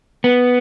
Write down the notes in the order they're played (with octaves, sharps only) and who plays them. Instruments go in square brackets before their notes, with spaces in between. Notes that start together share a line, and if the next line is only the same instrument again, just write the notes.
[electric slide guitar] B3